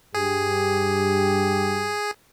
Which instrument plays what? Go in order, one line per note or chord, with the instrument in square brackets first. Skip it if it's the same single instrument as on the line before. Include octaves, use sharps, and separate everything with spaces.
[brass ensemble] G2 G4 [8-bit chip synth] G#4